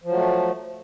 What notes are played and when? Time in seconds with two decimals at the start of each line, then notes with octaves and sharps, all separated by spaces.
0.04 F3
0.08 F#3
0.13 A3